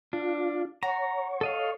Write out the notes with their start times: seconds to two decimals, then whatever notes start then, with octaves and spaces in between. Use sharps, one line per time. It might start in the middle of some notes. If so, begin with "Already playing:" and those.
0.13 D4 F4
0.83 F#4 C#5 A#5
1.41 A4 D#5 F5